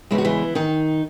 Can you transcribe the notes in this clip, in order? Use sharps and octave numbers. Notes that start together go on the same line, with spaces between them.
E2 C#3 G#3 E4
F#4
E3 E4
D#3 D#4